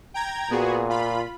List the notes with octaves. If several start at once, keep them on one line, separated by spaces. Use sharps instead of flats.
G5 A#5 G#6
A#2 B3 F#4 G#4
F4 B5